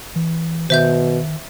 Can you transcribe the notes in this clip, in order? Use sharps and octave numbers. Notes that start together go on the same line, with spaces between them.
E3
B2 D#3 C5 E5 G6